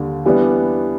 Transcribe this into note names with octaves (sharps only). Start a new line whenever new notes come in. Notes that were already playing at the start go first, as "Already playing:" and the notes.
Already playing: D#2 D3 G3
E3 G3 B3 D4